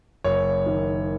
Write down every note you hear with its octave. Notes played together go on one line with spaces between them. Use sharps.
F#1 C#5
D#3